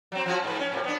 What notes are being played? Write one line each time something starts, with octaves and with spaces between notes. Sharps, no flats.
F#3 C4
F3 C#4 F#4
G#2 B4
C#4
A2 C3
B3 D4